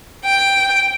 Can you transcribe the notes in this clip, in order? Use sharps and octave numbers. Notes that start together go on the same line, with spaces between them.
G5